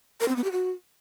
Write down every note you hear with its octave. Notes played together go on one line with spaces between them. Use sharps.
A#4
C4
B3
G4
F#4